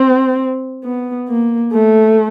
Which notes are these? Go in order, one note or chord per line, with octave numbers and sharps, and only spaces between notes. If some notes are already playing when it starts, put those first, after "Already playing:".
Already playing: C4
B3
A#3
A3